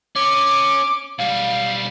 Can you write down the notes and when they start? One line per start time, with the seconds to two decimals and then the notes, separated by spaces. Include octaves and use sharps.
0.16 C#4 D6
1.19 B1 G3 F5